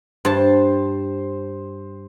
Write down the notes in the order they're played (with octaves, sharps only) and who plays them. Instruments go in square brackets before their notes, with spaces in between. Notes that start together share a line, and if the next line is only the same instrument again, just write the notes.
[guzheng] G2 A5 [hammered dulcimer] C5